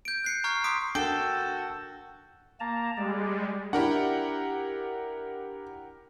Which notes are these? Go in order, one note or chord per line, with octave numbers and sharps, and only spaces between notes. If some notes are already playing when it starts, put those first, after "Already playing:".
G6 D7
F#6 C7 C#7
A#5 C#6 F6 G#6
C6 D6 D#6 B6 D7
D4 F#4 A4 A#4 G5 G6
A#3 A5 A#5
G3 G#3 D5
D4 E4 G4 A#4 F#5